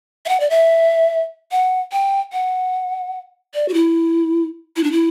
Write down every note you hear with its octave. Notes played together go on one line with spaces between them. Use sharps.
E5
F#5
D5
E5
F#5
G5
F#5
D5
F#4
E4
E4
D4
E4